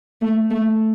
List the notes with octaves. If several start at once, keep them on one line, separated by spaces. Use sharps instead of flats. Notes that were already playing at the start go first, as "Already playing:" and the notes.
A3
A3